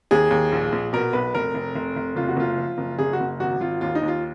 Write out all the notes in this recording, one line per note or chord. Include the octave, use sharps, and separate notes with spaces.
D#2 G#4
D#2
A#1
A#1
B2 A#4
B1 B4
F1 A#4
F1
F1
F1
F#1 F4
F#4
F#1 F4
F3
F#1
F#1 G#4
F#4
F#1
G#1 F#4
G#1 F4
D#2 F4
D#4
D#2
F4